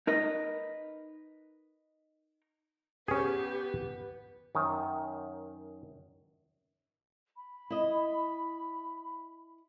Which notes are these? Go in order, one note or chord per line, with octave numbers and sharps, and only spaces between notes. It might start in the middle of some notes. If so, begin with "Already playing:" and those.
D#4 A#4 B4 D#5
B3 C#4 G4 G#4 B4
F#2 D#3
B5
E4 D#5